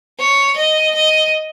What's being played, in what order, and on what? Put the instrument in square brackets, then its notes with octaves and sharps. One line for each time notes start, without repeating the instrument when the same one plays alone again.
[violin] C#5
D#5
D#5